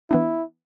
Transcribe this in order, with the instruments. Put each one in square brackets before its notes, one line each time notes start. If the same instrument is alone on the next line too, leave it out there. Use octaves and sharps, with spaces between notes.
[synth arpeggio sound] E3 B3 D4 [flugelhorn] E4